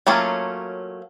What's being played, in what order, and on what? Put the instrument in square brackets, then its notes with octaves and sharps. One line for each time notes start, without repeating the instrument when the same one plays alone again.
[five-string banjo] F#3 A3 A#3 C#4 F4